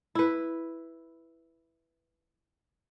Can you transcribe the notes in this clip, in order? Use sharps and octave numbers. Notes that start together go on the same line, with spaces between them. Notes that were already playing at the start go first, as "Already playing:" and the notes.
E4 B4